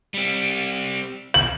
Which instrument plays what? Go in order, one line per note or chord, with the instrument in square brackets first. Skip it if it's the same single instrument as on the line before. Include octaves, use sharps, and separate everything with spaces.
[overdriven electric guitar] G3 C4
[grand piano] F#7